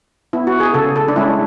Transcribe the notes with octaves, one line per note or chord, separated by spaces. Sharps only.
B3 E4
F#4
G#4
C#3 A4
A4
D4
G#3 C#4 E4